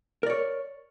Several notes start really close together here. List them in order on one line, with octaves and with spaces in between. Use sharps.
A#4 D5 C#5